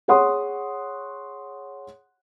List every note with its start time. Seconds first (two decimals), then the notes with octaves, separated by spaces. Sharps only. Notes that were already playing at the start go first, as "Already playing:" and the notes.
0.08 G#4 C#5 F#5 C6 D#6